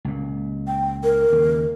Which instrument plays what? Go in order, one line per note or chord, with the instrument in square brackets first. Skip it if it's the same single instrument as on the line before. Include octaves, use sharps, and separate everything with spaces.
[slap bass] C#2 A#2
[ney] G5
A#4
[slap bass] D#2 C#3